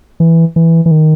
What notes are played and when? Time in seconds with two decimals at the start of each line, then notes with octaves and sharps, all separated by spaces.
0.20 E3
0.56 E3
0.86 E3
0.91 D#3